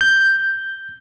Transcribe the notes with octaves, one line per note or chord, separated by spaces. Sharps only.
G6